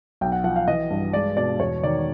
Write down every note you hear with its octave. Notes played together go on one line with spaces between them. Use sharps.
B1 G5
F#5
F3 F#5
F5
E3 D#5
G2
G#3 D5
B2 D5
E2 C#5
D#3 D5